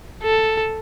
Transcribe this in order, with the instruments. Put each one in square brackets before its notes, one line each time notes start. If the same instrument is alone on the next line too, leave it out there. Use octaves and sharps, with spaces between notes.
[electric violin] A4